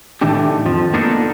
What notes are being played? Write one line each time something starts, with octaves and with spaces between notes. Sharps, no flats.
A2 D#3 E3 A3 D4 G4
F2 F3
A#3 B3 D4 D#4 A4